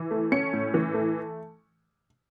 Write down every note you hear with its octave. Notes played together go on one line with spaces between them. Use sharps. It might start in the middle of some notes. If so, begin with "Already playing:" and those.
Already playing: E3
A3
C#4 C#7
A2
E3
A3